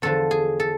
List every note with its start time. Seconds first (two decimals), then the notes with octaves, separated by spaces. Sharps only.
0.02 E2 D3 F3 A4
0.31 G#4
0.60 A4